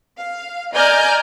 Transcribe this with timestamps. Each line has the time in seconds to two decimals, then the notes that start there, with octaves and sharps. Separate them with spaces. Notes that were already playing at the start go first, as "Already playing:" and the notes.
0.19 F5
0.74 D5 D#5 G#5 A#5 F6 G6